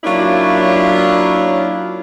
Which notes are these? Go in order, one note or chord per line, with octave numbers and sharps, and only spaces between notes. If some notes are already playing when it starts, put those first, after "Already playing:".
F#3 A#3 C#4 D4 E4 F4